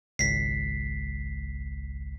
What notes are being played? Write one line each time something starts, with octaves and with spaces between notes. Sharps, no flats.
G#1 C#2 B6 C7